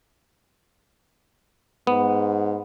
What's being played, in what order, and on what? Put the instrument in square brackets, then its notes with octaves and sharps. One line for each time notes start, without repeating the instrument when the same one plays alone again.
[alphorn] G#2 [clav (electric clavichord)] B3